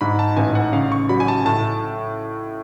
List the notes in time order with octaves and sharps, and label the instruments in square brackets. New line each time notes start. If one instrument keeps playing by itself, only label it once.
[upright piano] G#2 [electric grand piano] B5
[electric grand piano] A5
[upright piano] A1 [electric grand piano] G#5
[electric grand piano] F#5
[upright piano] C#3 [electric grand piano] F5
[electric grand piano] C#6
[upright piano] F#3 [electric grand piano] B5
[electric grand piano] G#5
A5
[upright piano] A2 [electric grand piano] A5